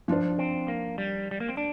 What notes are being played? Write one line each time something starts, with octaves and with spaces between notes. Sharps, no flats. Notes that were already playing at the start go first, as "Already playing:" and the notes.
F3 D4 F4 C5
C4
A#3
G3
G3
A#3
C4
D4